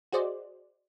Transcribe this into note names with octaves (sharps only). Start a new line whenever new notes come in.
F#4 G#4 C5 D5 D#5